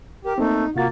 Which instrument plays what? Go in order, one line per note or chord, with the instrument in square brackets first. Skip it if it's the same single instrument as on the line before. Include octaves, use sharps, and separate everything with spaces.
[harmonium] G4 [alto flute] A#4
[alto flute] A3 [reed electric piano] A#3 C4 [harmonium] D#4
[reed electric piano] C3 F4 A6 [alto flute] A#3 [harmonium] F#4